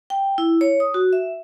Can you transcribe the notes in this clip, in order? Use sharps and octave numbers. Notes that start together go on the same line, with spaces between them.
G5
E4
C#5
D#6
F#4
E5